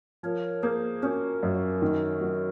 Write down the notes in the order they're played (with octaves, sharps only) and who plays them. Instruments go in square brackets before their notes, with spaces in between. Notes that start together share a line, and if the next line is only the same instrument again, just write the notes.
[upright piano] F3 [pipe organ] A#4 C#5
[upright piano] A#3 [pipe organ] G#4 C5
[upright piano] C#4 [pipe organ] F#4 A#4
[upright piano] F#2
D#3
F#3